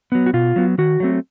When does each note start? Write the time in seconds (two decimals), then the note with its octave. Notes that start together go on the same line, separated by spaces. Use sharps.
0.12 F#3 B3
0.26 F#4
0.33 B2 F4
0.56 F#3 B3
0.78 D#3 F#4
1.00 F#3 A3 C4